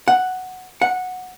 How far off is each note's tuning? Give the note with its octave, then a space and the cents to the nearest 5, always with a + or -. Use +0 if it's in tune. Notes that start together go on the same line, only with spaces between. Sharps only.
F#5 +0
F#5 -10